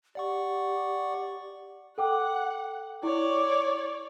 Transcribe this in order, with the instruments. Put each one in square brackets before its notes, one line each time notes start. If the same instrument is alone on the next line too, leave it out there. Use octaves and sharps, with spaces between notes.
[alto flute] G4 [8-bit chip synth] D5 F#5 C#6
[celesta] A4 G5 D6 [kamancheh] F#5
[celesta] E4 [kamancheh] C#5 D5